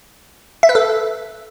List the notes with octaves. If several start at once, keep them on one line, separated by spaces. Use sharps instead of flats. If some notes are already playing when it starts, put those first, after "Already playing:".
E5
B4
A4